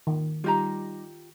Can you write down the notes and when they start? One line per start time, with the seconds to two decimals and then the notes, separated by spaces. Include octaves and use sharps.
0.07 D#3
0.44 G3 D#4 F4 G4 A#5